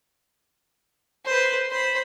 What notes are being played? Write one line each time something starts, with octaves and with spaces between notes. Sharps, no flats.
B4 C5
C5 B5